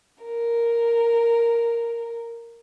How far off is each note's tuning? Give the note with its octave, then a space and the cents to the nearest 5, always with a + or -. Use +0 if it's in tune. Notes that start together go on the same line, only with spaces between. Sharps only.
A#4 +0